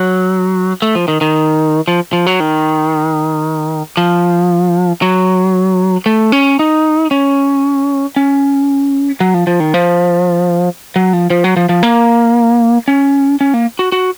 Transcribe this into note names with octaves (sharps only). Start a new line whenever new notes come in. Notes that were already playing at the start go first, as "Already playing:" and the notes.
Already playing: F#3
A3
F3
D#3
D#3
F3
F3
F#3
D#3
F3
F#3
A3
C#4
D#4
C#4
C#4
F#3
F3
F3
D#3
F3
F#3
F3
F3
F#3
F3
F3
A#3
C#4
C#4
A#3
F#4
F#4